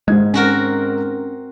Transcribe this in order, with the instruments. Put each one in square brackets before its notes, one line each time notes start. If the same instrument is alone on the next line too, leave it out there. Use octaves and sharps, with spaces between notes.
[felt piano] G#2 D#3 G#6 [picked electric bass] G#3
[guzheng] C4 F#4 A#4 [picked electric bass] C#4